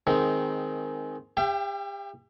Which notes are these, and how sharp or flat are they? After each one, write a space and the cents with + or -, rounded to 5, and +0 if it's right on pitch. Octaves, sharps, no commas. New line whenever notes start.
D#3 +0 G#3 +10 C4 +0
G4 +35 E5 +45 G5 +0